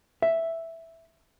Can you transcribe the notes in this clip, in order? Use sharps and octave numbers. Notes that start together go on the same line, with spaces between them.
E5